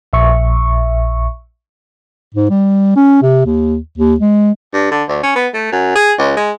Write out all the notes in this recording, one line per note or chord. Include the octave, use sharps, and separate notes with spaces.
A#1 E5 C#6
G#2
G3
C#4
C3
D#2
D#2
G#3
G2
D3
D2
C#4
B3
A3
F#2
G#4
C#2
G#3